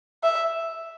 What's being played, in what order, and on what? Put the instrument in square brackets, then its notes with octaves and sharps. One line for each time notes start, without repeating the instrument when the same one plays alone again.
[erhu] E5